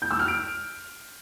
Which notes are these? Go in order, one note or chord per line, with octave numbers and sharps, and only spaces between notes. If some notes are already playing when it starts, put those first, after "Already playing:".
G6
E6
F6
D7